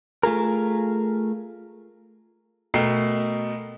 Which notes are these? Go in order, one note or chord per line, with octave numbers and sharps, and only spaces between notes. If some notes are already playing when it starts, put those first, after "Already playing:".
A3 F4 G#4 A#4
B2 A3 A#4 G5 C7